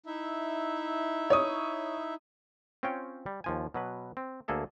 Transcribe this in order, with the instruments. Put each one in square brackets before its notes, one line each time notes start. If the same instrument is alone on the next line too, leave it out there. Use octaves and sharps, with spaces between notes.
[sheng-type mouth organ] D#4 E4 E5
[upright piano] C#5 D#6
[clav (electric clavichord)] C4 C#4 F4 C#5 G5
G3
D#2 F3 G#5
B2 F#3 B4
C4
D2 A#3 G#4 A4 E5